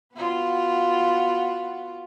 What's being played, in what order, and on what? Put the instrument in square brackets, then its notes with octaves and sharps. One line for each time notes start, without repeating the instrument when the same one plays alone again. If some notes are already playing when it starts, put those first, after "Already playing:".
[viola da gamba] B3 F4 F#4